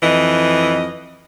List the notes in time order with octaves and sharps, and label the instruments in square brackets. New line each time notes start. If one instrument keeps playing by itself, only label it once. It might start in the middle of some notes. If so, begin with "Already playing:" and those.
[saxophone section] F2 E3 D#5